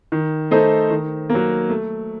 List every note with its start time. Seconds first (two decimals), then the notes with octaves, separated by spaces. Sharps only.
0.12 D#3
0.51 A3 D#4 A4 C5
0.90 D#3
1.30 A#3
1.35 F#3
1.70 A3